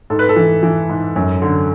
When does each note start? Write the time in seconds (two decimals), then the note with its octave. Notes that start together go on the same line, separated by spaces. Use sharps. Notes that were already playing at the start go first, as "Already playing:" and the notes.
0.10 G#2 A4
0.19 B4
0.29 A4
0.36 E3
0.63 E3
0.89 G#2
1.16 F#2
1.42 D3